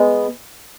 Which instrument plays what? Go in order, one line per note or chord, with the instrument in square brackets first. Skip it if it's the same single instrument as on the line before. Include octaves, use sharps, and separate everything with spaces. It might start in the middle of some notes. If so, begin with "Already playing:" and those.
Already playing: [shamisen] G#3 [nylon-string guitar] B3 G#4